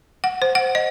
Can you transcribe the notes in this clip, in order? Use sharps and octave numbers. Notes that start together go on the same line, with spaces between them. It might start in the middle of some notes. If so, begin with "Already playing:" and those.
F#5
C5
F#5
D#5